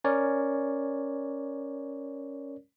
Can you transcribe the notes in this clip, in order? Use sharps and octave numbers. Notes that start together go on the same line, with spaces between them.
C#4 A#4 C#5 D5